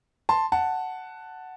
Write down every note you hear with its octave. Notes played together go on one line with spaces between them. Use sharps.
A5 C6
F#5 A5